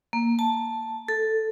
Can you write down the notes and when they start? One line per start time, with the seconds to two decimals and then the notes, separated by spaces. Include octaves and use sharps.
0.13 A#3
0.39 A5
1.08 A4